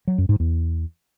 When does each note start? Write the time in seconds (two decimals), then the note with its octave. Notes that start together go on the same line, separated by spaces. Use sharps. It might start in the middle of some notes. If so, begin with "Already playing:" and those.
0.07 F#3
0.18 F#2
0.29 G#2
0.40 E2